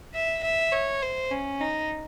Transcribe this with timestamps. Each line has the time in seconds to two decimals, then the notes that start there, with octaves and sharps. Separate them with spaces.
0.14 E5
0.43 E5
0.73 C#5
1.02 C5
1.31 C#4
1.60 D#4